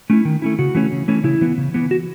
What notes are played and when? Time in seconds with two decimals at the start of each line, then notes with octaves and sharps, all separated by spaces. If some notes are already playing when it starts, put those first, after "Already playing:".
0.10 A3 C#4 E4
0.25 D#3
0.42 A3 C#4 E4
0.59 C#3 F#4
0.75 E3 A3 C#4
0.92 C#3
1.08 E3 A3 C#4
1.24 C#3 E4
1.41 E3 B3
1.58 C#3
1.74 E3 B3
1.91 F#4